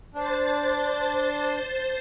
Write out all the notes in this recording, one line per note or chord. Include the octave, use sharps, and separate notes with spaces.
D4 C5 A6